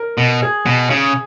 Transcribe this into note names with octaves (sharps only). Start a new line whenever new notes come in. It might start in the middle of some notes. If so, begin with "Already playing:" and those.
Already playing: A#4
B2
G#4
B2
C#3 G#4